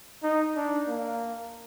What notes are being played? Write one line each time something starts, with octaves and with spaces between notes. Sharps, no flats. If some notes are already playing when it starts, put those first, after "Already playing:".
D#4
D4
A#3